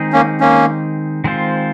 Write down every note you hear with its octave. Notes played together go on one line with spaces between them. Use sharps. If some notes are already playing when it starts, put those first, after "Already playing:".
Already playing: D#3 G#3 C4 D#4 G#4
A#3 C#4
A#3 C#4
D#3 G#3 C4 F4 C5